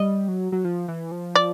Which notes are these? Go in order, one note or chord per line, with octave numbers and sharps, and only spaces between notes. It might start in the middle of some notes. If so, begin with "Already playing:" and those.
Already playing: G3 D#5
F#3
F#3
F3
E3
F3
D5